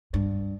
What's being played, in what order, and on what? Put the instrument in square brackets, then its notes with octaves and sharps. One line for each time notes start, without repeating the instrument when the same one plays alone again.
[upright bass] G2